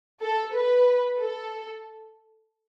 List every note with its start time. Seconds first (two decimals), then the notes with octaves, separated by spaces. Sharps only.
0.21 A4
0.54 B4
1.20 A4